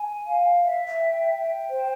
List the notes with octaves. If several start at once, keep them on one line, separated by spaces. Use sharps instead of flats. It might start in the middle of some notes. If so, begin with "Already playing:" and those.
Already playing: G#5
F5
E5
G5
G5
C5